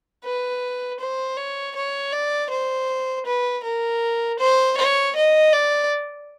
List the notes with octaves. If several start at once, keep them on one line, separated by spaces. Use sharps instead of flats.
B4
C5
C#5
C#5
D5
C5
B4
A#4
C5
C#5
D#5
D5